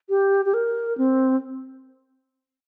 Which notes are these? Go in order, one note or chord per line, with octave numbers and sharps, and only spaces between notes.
G4
G4
A#4
C4